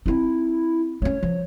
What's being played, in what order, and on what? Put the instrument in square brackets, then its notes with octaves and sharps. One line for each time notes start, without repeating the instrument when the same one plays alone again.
[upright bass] C4 D#4 [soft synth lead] E4
[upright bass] A3 C#4 [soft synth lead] C#5
[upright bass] F3